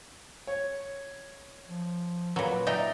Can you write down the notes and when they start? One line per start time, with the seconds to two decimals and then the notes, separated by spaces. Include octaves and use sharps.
0.47 C#5
1.68 F3
2.36 A#2 F#3 B4
2.67 D#4 D5 E5 G5 A#5